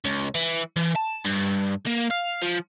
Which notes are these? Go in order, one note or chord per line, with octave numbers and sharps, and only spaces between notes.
C#2
E3
E3
A5
G2
A#3
F5
F3